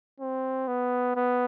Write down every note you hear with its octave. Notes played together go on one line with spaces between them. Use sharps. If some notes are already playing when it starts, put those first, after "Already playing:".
C4
B3
B3